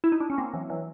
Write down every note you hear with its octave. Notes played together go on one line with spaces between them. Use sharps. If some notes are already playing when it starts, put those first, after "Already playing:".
E4
D#4
D4
C#4
A#3 C4
E3 F#3
E3 F#3